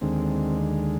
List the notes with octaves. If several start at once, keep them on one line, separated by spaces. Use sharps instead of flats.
D#2 D3 G#3 C4